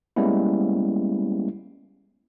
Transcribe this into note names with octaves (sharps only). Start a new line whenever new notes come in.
G3 G#3 A#3 B3 C#4 E4